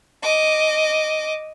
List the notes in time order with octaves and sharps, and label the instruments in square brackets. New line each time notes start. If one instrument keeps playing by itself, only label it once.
[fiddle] D#5 D6